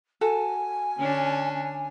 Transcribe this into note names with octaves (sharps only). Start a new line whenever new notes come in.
F#4 A4 G#5
D3 C#4 D4